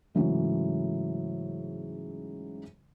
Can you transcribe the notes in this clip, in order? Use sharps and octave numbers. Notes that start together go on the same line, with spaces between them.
G#2 C#3 E3 F#3 A3